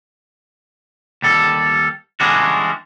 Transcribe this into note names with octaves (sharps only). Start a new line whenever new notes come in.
D#2 G3 A4
E3 G3 G#3 C#4 D4 F#4